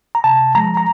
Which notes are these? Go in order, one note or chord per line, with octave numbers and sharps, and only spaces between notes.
A#5
C3 A5
F3 G#3 A#5
A#5